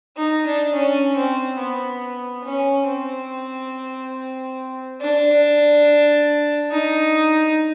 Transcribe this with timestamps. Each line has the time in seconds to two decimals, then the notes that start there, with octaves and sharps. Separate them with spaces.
0.17 D#4
0.46 D4
0.74 C#4
1.16 C4
1.59 B3
2.44 C#4
2.87 C4
5.01 D4
6.71 D#4